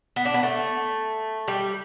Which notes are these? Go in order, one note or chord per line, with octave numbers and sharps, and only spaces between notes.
B3
D4
B3
A3
G3